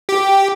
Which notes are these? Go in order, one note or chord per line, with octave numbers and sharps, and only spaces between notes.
G4